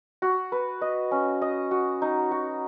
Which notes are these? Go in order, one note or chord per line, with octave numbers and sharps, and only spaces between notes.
F#4
B4
D#5
C#4
D#5
F#4
D#4
F#4